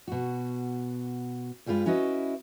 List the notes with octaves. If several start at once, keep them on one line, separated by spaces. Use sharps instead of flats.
B2 F#4
G2 G3 G#3 F4 B4
C#4 E4 F#4 B4 D#5